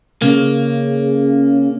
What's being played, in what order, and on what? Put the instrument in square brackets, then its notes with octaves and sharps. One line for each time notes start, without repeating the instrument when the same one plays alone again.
[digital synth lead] C#3 [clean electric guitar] A#3